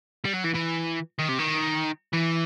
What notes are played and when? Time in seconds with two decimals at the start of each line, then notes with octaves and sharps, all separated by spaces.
0.25 G3
0.34 F#3
0.45 E3
0.55 E3
1.19 D#3
1.28 C3
1.39 D#3
2.13 E3